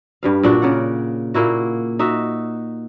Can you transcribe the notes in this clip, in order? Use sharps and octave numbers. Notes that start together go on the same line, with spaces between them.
G2 G3 F5
A#2 D4 F#4
C#3 A#4 D5 F#5
A#2 A#3 E4 F#4
D#4 F#4 E5